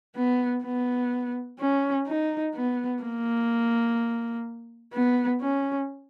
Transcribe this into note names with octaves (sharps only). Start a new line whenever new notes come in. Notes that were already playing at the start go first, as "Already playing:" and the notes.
B3
B3
C#4
D#4
B3
A#3
B3
C#4